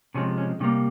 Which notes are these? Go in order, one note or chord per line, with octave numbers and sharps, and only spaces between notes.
C3 F3 G#3 C#4
C#4
C3 G3 A#3 C#4